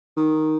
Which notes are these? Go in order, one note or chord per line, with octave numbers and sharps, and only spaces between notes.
D#3